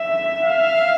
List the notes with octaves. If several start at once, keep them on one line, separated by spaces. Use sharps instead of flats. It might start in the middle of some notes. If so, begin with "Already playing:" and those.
Already playing: E5
F5